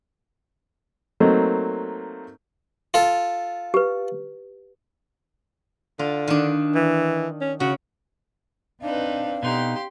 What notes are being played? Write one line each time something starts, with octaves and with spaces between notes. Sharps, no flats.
F#3 A3 A#3 C4 D#4
F4 A4
G4 B4
D3 F4
D#3 D4
E3
C#4
C#3 F#4
C4 D4 D#4 B4 F5
B2 D#4 G4 C6